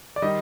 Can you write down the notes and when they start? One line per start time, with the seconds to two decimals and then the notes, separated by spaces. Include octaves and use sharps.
0.16 D5
0.22 D#3 G3 D#5